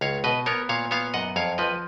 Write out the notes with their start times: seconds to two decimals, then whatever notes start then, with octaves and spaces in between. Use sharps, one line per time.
0.01 C#2 C#5 F5
0.24 B2 B4 D#5
0.46 B3 A#4 C#5
0.69 A#2 C#5 F5
0.91 B3 C#5 F5
1.14 F#2 D#5 F#5
1.36 F2 C#5 F5
1.58 F3 B4 D#5